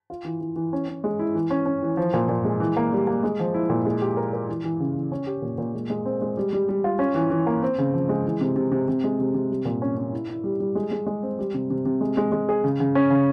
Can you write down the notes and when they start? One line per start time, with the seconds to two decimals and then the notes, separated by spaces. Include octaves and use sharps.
0.10 F4
0.25 E3
0.41 E3
0.56 E3
0.73 C#4
0.89 C#4
1.04 G#3
1.19 E4
1.35 E3
1.50 C#4
1.66 C#4
1.83 E3
1.97 F3
2.14 A#2
2.29 A#2
2.44 G#3
2.60 E3
2.77 A#3
2.92 G3
3.07 A#3
3.23 G#3
3.39 F3
3.54 E4
3.70 A#2
3.85 G#3
4.01 G4
4.17 A#4
4.33 A#4
4.49 E3
4.64 E3
4.80 C#3
4.96 E3
5.12 C#4
5.27 G4
5.42 A#2
5.58 A#2
5.75 G#3
5.90 G#3
6.05 C4
6.22 G#3
6.37 G3
6.53 G3
6.69 G3
6.84 F4
6.99 C#4
7.15 E3
7.30 E3
7.47 A#3
7.63 C4
7.78 C#3
7.94 F3
8.09 G#3
8.25 E3
8.41 C3
8.56 C3
8.72 C3
8.88 C3
9.04 G#3
9.19 C3
9.34 C3
9.50 G3
9.65 A#2
9.82 C#4
9.97 C#4
10.13 E4
10.29 E4
10.44 G3
10.60 G3
10.75 G#3
10.91 G#3
11.06 G#3
11.23 C4
11.39 G3
11.54 C3
11.70 C3
11.85 C3
12.01 G#3
12.17 G#3
12.32 G#3
12.49 G#4
12.64 C#3
12.80 C#3
12.95 C#4
13.10 C#3